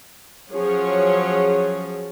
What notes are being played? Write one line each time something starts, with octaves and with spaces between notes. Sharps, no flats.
F3 F#3 C#4 G#4 C#5